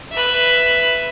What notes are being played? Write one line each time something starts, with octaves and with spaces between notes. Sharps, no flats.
B4 E5